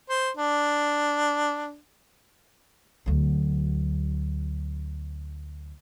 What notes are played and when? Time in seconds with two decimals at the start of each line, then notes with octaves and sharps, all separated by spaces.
0.10 C5
0.37 D4
3.06 D2 F#3